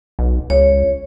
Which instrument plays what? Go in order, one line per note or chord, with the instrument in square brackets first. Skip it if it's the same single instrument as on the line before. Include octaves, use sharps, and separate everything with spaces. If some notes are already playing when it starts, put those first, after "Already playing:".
[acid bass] B1
[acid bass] C#2 [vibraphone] C#5